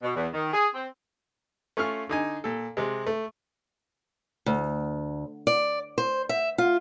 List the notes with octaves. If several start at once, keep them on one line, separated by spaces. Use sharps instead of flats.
B2
E2
D#3
G#4
C4
A3 C#4 F4 F5 C#6 F6
D3 D#4 G#5
A#2 A4
C3 G#3
A3
D2
D5
C5
E5
F4